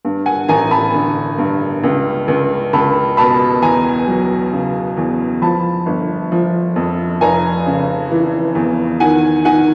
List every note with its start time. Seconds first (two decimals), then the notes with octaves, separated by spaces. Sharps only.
0.05 G2
0.26 F#5 G#5
0.49 A1 G#5 A#5
0.71 A5 B5
0.94 D3
1.38 G2
1.84 C#2
2.28 C#2
2.73 C#2 A5 B5
3.17 B2 A5 B5
3.62 E2 G#5 A#5
4.07 F#3
4.53 C#3
4.97 E2
5.42 F3 A5 B5
5.86 G1
6.32 F3
6.76 F2
7.21 F1 G#5 A#5
7.66 C#3
8.12 E3
8.55 E2
9.00 D#3 F#5 G#5
9.45 D#3 F#5 G#5